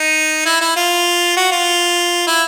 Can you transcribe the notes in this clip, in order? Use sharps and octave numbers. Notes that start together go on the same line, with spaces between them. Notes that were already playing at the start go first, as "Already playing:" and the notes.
Already playing: D#4
E4
E4
F4
F#4
F4
E4